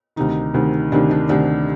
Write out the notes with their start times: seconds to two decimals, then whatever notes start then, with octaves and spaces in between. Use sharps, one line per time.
0.16 D2 C3 D#3 D#4
0.54 D2 C3 D#3
0.92 D2 C3 D#3 D4
1.11 D4
1.29 D2 C3 D#3 D4